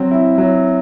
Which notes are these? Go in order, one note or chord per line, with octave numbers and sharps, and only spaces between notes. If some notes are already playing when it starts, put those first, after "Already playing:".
Already playing: F#3 C4
E4
F#3